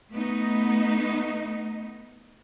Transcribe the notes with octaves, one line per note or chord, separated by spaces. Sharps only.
A3 B3 D#4